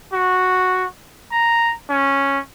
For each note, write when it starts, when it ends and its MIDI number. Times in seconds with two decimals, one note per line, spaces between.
0.13 0.85 66
1.32 1.74 82
1.90 2.39 61